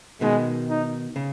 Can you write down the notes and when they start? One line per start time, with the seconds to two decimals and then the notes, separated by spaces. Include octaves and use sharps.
0.21 B2 D#3 G#3
0.69 D#4
1.16 C#3